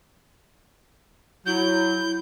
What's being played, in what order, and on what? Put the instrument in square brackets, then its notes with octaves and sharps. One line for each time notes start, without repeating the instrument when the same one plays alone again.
[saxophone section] F#3 [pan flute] E4 [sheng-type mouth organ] G6